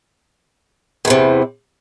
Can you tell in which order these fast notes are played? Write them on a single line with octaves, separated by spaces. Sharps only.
E2 E3 C3